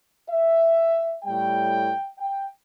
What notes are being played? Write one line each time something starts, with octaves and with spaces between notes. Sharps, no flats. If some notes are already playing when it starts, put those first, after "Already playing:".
E5
A2 G3 G5
G5